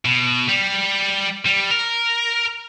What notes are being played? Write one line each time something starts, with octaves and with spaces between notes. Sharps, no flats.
B2
G3
G3
A#4